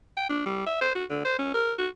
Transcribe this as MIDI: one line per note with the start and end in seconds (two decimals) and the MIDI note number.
0.17 0.29 79
0.29 0.41 62
0.45 0.65 55
0.66 0.80 76
0.81 0.91 72
0.95 1.04 66
1.10 1.21 50
1.24 1.37 72
1.38 1.49 61
1.54 1.73 70
1.78 1.88 66